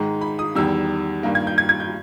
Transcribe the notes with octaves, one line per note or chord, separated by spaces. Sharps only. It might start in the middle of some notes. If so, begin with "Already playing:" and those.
Already playing: G#2 D#3 G#3 A#5
B5
D#6
E2 D#3 G3 E6
G2 D#3 A#3
G#6
G6
G#6
G#6
G6